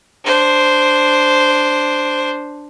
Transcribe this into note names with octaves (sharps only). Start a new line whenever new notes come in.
D4 C5